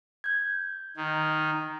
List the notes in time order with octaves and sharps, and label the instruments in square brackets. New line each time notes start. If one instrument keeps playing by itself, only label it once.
[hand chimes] G6 G#6
[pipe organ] D#3